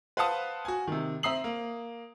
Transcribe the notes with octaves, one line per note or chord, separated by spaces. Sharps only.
B4 C5 F5 F#5 A5 D#6
F#4 G#5
C3 D#3
C4 E5 A#5 D#6 C7 F#7
A#3